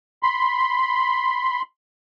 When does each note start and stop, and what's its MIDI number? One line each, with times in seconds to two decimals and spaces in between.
0.23 1.62 83
0.23 1.62 84